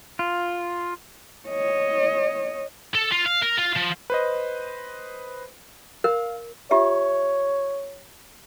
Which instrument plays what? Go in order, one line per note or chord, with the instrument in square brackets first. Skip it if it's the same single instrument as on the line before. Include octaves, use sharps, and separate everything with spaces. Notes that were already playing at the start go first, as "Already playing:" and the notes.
[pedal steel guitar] F4
[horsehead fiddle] C#5 D#5
[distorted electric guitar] A4
F4
F5
A#4
F4
F3
[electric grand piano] B4 C5 D#5
[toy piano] A#4 [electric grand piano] F5
[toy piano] F4 G4 E5 [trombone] C#5